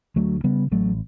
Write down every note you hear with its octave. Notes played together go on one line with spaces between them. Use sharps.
D2 F#3 A3
C#3 G3 B3
A1 F#3 A3